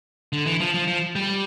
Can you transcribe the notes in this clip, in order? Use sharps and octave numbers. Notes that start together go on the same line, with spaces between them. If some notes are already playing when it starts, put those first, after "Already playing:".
D3
E3
F3
F3
F3
G3